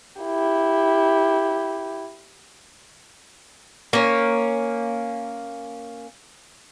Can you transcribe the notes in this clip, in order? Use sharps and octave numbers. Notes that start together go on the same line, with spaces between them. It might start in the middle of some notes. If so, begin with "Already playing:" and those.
E4 G4
A#3 C#4